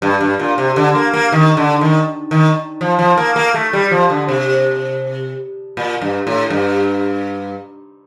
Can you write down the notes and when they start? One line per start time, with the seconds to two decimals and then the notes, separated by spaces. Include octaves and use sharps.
0.02 G2
0.21 G2
0.39 A#2
0.58 C3
0.76 D3
0.95 A#3
1.14 A#3
1.32 D#3
1.57 D3
1.81 D#3
2.31 D#3
2.81 F3
2.99 F3
3.17 A#3
3.36 A#3
3.54 A3
3.73 G3
3.91 F3
4.10 D3
4.29 C3
5.77 A#2
6.02 G2
6.27 A2
6.50 G2